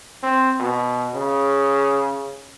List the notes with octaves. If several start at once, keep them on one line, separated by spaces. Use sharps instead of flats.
C4
B2
C#3